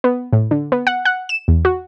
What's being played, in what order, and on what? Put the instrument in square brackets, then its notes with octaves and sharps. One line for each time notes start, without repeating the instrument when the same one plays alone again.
[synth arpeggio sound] B3
A2
D3
B3
F#5
F#5
E7
E2
F#4